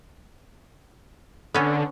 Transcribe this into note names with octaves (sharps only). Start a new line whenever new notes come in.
D3 B3 C#4